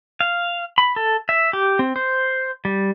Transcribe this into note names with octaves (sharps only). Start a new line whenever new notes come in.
F5
B5
A4
E5
G4
C4
C5
G3